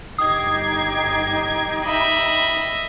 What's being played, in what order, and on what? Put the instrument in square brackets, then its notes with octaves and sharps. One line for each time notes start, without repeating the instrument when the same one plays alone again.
[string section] G1 G#6 C7 [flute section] D#4 G4 G5 [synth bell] D#6
[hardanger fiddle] D#5 E5 [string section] B5